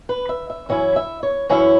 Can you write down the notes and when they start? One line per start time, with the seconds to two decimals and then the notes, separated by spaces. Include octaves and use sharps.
0.09 B4
0.29 E5
0.50 E5
0.69 F#2 E3 C#4 E4 C#5
0.96 E5
1.23 C#5
1.49 F#2 E3 C#4 E4 C#5